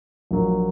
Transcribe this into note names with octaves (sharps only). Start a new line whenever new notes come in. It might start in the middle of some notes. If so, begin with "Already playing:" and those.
A#1 A#2 F#3 A#3